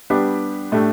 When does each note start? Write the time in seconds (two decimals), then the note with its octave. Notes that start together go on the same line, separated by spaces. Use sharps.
0.10 G3 B3 D4 G4
0.72 A2 A3 D4 G4